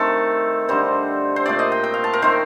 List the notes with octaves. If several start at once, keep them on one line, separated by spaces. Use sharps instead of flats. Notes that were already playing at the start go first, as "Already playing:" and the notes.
Already playing: D#3 A3 C4 A4
D3 G3 C4 C5
C5
A#2 A3 C4 D5
D#5
G5
G5
F5
A5
A#4
D#3 A3 C4 C5